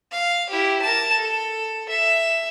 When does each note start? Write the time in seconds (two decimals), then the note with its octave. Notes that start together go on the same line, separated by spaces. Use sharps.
0.12 F5
0.49 E4 G4
0.82 A#4 A5
1.17 A4
1.89 E5